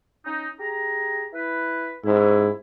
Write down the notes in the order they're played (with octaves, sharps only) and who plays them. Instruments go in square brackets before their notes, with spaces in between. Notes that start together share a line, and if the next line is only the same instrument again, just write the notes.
[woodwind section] C#4 D#4
G4 G#4 A#5
E4 B4
[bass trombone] G#2 [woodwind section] C3 C#4 E4